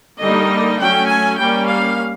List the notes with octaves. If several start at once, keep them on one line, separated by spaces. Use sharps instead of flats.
D3 G3 A#3 D#4 D#5
F#3 A3 C#4 G5
G#5
G3 A#3 C#4 G5
F5